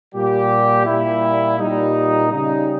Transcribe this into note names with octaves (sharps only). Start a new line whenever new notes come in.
A#2 G3 G4
A#2 G3 E4
A#2 G3 D#4
C#3 G3 D#4